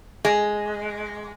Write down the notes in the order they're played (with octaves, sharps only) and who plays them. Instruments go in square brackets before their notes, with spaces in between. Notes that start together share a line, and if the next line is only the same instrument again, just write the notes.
[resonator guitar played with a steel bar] G#3